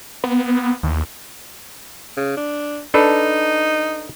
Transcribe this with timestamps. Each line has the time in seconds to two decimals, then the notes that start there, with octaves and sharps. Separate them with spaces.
0.24 B3
0.83 D#2
2.17 C#3
2.37 D4
2.94 D4 D#4 A4 B4